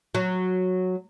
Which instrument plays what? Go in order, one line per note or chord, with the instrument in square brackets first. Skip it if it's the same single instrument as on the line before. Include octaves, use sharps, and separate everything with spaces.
[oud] F#3